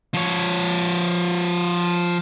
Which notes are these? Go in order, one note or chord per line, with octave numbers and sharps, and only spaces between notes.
F3 C#5